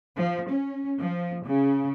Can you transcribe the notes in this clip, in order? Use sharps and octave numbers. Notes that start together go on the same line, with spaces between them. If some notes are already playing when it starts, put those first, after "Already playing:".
F3
C#4
F3
C#3